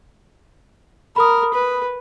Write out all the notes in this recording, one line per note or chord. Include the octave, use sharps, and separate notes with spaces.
A#4 B5 D#6
B4